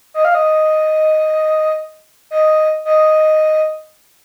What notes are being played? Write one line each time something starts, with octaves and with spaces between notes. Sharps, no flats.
D#5
F5
D#5
D#5
D#5